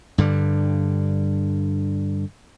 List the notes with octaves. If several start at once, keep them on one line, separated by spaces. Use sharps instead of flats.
G2 D3 G3